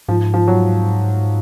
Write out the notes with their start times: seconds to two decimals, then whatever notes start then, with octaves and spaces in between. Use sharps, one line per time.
0.08 G#2 F3
0.34 F3
0.48 F#3